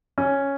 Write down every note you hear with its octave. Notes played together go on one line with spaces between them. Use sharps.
C#4